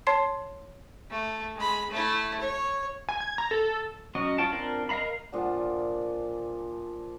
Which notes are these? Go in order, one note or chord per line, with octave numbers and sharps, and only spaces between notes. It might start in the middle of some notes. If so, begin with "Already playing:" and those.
C#5 A5 C6 C7
A3
G#3 B5
A3 E4
C#5
G#5
G#6
A#5
A4
F#3 C#4 F#4 D#5
F4 C#5 G5 A5
C4 D4 F4 A#4 G5
A#4 D#5 F5 A#5 B5
A#2 F3 D4 F#5